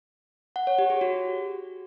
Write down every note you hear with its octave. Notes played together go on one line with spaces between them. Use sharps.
F#5
C#5
G4
G#4
F#4